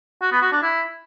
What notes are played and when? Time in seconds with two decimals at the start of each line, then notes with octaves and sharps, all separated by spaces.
0.22 F#4
0.32 B3
0.42 F#4
0.52 D4
0.62 E4